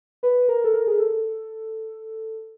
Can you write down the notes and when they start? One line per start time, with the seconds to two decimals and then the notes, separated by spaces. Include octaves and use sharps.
0.23 B4
0.49 A#4
0.64 A4
0.74 A#4
0.87 G#4
0.99 A4